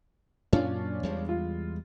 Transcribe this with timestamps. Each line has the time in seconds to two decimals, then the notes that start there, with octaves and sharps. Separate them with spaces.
0.53 F#2 A#2 C#4 D4 F4
1.03 E2 G3 G#3
1.29 F4